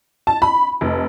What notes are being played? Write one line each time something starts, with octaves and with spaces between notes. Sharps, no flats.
A5
B5
F1